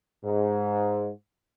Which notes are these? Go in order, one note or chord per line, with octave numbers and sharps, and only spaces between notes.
G#2